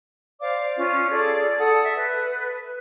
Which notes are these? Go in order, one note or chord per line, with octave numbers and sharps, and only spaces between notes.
C5 D5 F5 D6
C#4 F4
G#4 A4 D5
A4 F#5 D#6
E5
B4